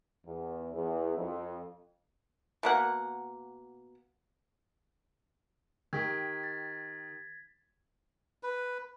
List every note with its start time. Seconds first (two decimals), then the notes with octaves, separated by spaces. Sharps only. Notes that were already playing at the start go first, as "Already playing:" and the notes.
0.25 E2
0.74 E2
1.16 F2
2.63 B2 A#3 F#5
5.93 D#3 G4 G#6 B6
6.44 A6
8.43 B4